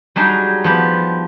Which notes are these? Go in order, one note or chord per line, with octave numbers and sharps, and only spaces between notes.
F#3 G3 D4 D#4 G#4
F3 B3 G4